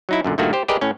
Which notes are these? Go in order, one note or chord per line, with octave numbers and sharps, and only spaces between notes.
F#3 D#4 E4
F#2 A#2 D3
G2 A#2 D#3 A3 A#3 F#4
G4 C5
G4 G#4 A#4 B4 D5 D#5
A2 C#4